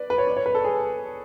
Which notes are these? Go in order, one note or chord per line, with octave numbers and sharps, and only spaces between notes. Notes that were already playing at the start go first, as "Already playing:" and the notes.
Already playing: B4 D5
B4
C#5
D5
C#5
B4
A4
G#4